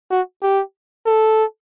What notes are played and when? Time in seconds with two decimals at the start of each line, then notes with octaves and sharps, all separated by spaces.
0.11 F#4
0.43 G4
1.06 A4